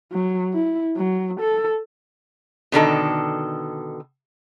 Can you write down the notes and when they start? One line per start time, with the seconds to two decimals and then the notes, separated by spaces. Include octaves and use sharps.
0.12 F#3
0.53 E4
0.97 F#3
1.40 A4
2.72 B2 D3 D#3 A4